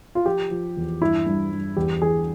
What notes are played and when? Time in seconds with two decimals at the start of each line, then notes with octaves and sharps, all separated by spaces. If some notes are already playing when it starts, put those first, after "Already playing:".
0.15 F4
0.26 F3 G4
0.51 F3
0.77 E2
1.01 G2 E4
1.26 G2
1.52 G2
1.77 E2 G4
2.02 E3 G#4